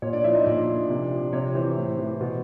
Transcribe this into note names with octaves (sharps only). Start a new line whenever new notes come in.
A#2 C#5
D4 D5
F3 E4 E5
D#4 D#5
A#2 D4 D5
F3
C3
F3
C3 C#5
E3 C5
A2
E3
B2